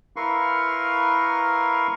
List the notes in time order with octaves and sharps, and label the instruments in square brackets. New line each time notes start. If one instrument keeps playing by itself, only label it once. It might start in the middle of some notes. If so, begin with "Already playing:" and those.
[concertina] E4 A#4 B4 F5 C6 C#6